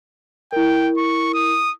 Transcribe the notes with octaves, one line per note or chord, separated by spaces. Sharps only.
E4 A#4 G5
C#6
D#6